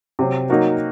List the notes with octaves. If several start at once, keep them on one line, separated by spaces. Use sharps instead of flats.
C3 F#3 C4
F#3 A#3 D#4 F#4 A#4